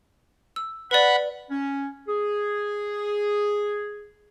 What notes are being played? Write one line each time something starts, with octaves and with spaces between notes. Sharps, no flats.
E6
B4 D5 F#5 B5
C#4
G#4